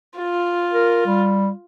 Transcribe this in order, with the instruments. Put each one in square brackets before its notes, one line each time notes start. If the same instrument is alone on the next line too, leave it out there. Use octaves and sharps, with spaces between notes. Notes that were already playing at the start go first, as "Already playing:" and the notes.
[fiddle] F4
[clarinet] A#4
G3